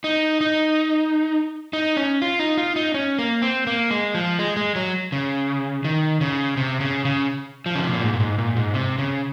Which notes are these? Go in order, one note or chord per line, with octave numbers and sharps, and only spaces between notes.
D#4
D#4
D#4
C#4
F4
D#4
F4
D#4
C#4
A#3
C4
A#3
G#3
F3
G#3
G#3
F#3
C#3
D#3
C#3
C3
C#3
C#3
F3
C#3
C3
A#2
G#2
A#2
G#2
A#2
G#2
C3
C#3